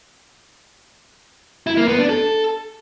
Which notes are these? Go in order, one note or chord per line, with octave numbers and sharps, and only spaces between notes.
E4
A#3
B3
D4
A4